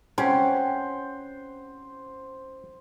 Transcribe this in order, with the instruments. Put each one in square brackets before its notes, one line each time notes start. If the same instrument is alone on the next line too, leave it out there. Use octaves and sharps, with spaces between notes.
[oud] C4 [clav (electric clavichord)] C#4 [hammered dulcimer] C5 F#5